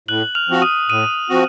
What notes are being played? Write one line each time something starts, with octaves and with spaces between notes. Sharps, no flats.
A2 F#6 F#7
F6 F7
F3 C4 F#4
D#6 D#7
A2 D#6 D#7
F3 C4 F#4